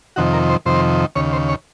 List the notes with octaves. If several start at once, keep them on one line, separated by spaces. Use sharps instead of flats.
F2 C3 D#3 F#4
A#4
C5
F2 C3 D#3 C5
D#2 C#3 C#5
C5
C#5